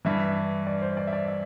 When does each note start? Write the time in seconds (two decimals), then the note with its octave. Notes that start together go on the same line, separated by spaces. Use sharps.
0.05 G2 E3 E5
0.67 D5
0.82 C5
0.97 D5
1.07 E5
1.13 D5
1.28 E5